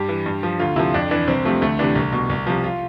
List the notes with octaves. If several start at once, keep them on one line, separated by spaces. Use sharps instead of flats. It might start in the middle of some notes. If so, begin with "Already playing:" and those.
Already playing: G2 G4
E3
G2
F3
D2 F4
C3 F3 E4
F2 D4
E3 D4
C2 C4
C3 F3 A3
D2 A3
C3 E3 D4
C2
B2
C2
C3 F3
F4